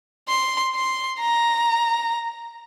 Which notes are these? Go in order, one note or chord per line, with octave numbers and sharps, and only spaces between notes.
C6
C6
A#5